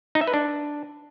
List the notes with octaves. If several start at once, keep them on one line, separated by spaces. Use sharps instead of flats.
D#4
E5
B4
D4